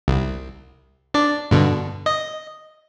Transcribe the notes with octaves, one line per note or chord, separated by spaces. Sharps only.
C2
D4 D5
G2 B2 D3
D#5